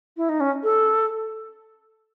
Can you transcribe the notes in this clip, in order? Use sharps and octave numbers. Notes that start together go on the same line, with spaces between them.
E4
D#4
C#4
A4